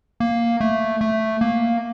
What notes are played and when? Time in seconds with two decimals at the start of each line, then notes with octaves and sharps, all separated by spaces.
0.20 A#3
0.61 A3
1.01 A3
1.41 A#3